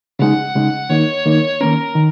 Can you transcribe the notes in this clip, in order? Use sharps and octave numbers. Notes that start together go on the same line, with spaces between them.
C#3 G#3 D#4 F#5
C#3 G#3 D#4
D#3 A#3 D#4 C#5
D#3 A#3 D#4
D#3 A#3 C#4 A#4
D#3